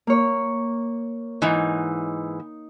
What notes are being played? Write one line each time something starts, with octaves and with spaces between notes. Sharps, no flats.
A#3 C#5
G#2 E3 D#4